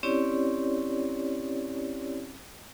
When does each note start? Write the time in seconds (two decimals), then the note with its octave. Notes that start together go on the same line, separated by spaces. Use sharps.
0.03 C4 C#4 E4 G4 C#5 D5